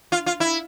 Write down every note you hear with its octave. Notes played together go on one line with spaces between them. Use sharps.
F4
F4
E4